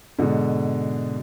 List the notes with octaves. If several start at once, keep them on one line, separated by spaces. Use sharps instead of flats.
G#2 B2 D3